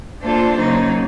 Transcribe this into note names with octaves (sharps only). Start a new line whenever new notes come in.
A#3 D4 F4 A4 C5
C#3 F#3 A#3 D#4